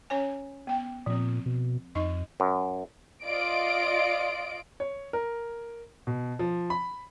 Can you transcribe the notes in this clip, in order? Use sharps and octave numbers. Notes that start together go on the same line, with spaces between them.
C#4 C#5 G#5
B3 G5
A#2 F3 C4
B2
F2 D#4 D#5 C#6
F#2
F4 D5 D#5 D7
C#5
A#4
B2
F3
B5